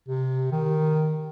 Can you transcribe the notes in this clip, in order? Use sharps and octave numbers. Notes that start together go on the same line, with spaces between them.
C3
D#3